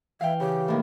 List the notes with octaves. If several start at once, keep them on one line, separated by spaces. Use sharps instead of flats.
E3 E5 F5 G5
C#3 G4
A2 D#3 A#3